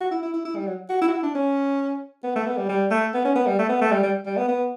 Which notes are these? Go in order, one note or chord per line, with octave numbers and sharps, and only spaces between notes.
F#4
E4
E4
E4
E4
G3
F#3
F#4
E4
F#4
E4
D4
C#4
B3
A3
B3
G3
G3
A3
B3
C#4
B3
G3
A3
B3
A3
G3
G3
G3
B3
B3